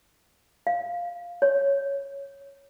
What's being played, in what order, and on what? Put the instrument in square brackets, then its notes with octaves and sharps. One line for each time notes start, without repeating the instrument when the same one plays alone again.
[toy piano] F5
C#5